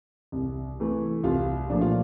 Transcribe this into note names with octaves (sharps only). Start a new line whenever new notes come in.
C2
C3 E3 A3
C2 F4
A#2 F3 A3 D4
F4